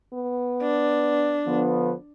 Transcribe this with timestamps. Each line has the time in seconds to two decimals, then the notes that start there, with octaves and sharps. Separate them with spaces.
0.13 B3
0.62 D4
1.47 D3 F3 B3